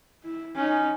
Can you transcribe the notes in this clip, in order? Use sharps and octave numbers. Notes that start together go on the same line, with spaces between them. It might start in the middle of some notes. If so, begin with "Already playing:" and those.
E4
C#4 D#4